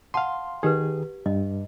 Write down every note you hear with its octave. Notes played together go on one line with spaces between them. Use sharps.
F5 F#5 A5 C6
D#3 G4 G#4 B4
G2 D#5